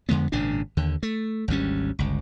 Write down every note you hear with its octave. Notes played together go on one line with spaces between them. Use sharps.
F2 D3 G#3 B3
G#1 A#2 C#3 D4
D#2 D3
A3
G#1 D2 G3 C#4
G1 C#2